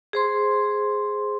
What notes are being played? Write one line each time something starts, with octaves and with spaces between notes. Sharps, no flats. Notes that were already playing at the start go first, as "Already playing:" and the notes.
G#4 C5 C6